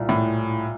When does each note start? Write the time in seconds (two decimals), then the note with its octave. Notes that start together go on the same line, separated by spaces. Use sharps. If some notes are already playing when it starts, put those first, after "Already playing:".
Already playing: C2 A#2
0.09 A2